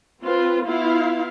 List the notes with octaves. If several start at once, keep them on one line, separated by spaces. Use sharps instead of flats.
C4 F4 B4
B3 E4 F4 F5